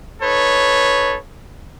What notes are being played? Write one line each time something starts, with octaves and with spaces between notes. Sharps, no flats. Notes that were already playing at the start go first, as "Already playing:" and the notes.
D#4 A4 B4 C#5